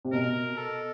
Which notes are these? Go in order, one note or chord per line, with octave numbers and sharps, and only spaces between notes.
C3
B2 A#4
A4